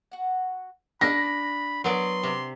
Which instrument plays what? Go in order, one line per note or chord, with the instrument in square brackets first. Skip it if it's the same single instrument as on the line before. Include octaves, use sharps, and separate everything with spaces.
[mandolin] F#4 F#5
[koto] D4 [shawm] B5 [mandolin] D#6 [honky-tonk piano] A#6
[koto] F#3 B3 D5 [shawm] C6
[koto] C3 [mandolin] D6